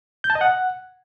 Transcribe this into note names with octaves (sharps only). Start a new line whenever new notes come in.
G6
A5
D#5
F#5